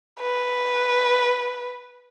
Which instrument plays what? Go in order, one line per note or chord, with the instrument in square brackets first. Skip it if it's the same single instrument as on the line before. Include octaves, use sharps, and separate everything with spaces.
[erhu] B4